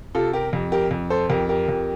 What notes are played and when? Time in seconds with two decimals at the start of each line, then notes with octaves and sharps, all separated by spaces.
0.15 C3 F4 A4
0.33 G4 A#4
0.53 F2
0.72 G4 A#4
0.91 F2
1.10 A4 C5
1.29 F2 G4 A#4
1.49 G4 A#4
1.68 F2